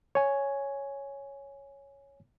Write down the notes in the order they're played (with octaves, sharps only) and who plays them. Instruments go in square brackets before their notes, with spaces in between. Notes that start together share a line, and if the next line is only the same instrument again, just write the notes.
[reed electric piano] C#5 G#5